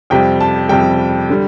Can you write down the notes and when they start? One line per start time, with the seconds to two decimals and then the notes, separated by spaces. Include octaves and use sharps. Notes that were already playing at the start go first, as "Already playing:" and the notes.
0.10 F2 C3 G3 G5
0.40 A5
0.69 F2 C3 G3 G5
1.30 D3 G3